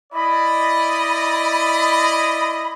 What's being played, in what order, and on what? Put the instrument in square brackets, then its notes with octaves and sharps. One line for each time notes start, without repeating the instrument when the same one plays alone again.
[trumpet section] E4 D5 D#5 [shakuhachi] B5